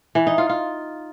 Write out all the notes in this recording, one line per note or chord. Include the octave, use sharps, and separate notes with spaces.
E3
D#4
F4
F4